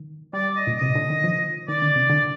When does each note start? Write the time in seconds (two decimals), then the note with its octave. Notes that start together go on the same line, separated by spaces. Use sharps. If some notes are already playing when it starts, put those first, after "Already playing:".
Already playing: D#3
0.33 G3 D5
0.56 D#5
0.67 A#2
0.78 C3 D#5
0.95 D3
1.10 D#3
1.24 F3
1.68 D#3 D5
1.82 D3
1.96 C3
2.10 D3